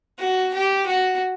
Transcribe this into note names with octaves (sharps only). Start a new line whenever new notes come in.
F#4
G4
F#4